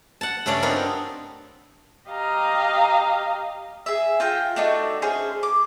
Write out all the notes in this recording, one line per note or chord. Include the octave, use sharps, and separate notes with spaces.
F#5 A5
G2 C#3 A3 C#4 D4 D5
B3 C4 D#4 F4 A#4
G4 D#5 F5 A#5
G#4 E5
F4 G5 A#5
A3 D4 D#4 F#4
C#4 G#4 C5
D6